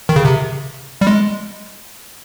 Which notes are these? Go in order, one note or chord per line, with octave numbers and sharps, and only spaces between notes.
D#3
C#3
C3
G3
G#3